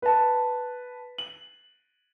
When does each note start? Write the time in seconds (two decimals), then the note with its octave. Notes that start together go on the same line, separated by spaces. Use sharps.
0.02 B4 A5
1.18 F#7